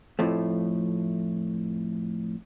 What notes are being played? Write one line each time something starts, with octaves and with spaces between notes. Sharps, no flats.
F2 A2 F3 A3